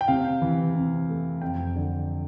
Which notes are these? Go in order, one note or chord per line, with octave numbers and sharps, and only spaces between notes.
G5
C3 F5
E3
C3
A3
F2 G5
D3